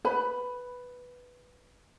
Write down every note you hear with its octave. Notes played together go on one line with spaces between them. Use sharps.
B4 B5